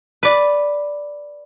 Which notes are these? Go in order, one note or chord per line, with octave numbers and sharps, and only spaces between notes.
B4 D5